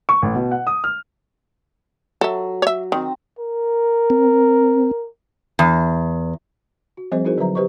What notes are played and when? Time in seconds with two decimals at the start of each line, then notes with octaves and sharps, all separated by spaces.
0.09 C#6
0.22 A1
0.35 B2
0.51 F#5
0.67 D#6
0.84 F6
2.21 F#3 A4 E5
2.62 C#5 E5
2.92 D#3 C4 D#4 D#5
3.39 A#4
4.10 C4
5.59 E2
6.97 F#4
7.12 F3 G3 C4 G#4 C5 D#5
7.25 D#4 E4 F#4 G#4 A#4 C5
7.37 D3 F#3 B4 C5 E5 A#5
7.55 G4 B4 C5 D#5 C#6